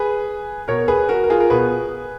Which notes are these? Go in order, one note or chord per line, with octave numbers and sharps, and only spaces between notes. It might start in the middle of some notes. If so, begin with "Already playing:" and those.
Already playing: G#4 B4
B2 A#4 C#5
G#4 B4
F#4 A#4
A#4
F4 G#4
A#4
B2 G#4 B4